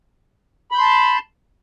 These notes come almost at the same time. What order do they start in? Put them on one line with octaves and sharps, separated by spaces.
B5 G6 C6 A5